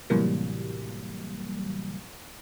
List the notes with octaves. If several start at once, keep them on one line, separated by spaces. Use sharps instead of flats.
A2 C3 E3 F#3 G3 A#3